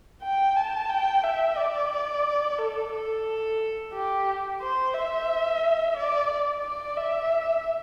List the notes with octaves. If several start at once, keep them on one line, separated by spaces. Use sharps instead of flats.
G5
A5
G5
E5
D5
A4
A4
G4
C5
E5
D5
D5
E5